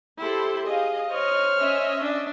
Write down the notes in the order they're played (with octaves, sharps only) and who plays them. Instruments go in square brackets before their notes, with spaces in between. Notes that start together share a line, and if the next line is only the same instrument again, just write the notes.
[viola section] E4 A4 C6 [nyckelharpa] G4 C5
[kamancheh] G#4 F5 [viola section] D#5
[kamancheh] C5 F6 [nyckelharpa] C#5
[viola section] C#4 D#5 E5
[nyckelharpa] D4 D5